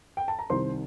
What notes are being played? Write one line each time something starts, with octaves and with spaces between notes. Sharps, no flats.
G5
A5
A#5
C2 C3 D#3 C5 C6